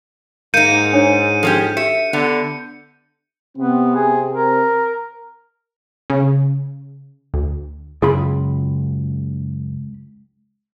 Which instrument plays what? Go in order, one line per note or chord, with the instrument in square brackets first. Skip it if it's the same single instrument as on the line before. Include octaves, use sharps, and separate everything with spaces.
[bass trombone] G#2 [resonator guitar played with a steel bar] A#3 D#4 [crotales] G6 C#7 D#7
[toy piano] D4 C#5
[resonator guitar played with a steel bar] F3 C#4 G4 [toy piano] A4
[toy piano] G4 [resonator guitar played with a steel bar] E5 [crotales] C#7
[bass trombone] D3 [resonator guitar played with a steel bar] B3
[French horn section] C3 C4 [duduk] B3
[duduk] G#4
A#4
[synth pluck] C#3
D2
[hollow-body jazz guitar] C#2 F4 B5 [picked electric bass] F#2 C#3 [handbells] G#4